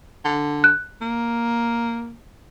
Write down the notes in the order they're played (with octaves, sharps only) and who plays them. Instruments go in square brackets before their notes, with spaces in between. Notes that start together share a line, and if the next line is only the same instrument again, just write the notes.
[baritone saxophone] D3
[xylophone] F#6
[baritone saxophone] A#3